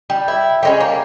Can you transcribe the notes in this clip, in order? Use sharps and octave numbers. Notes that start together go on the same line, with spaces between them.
G3
E4
G3 G#3 C#4
A#3